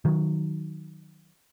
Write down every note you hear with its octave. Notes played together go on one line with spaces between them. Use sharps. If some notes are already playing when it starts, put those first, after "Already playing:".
D#3 F#3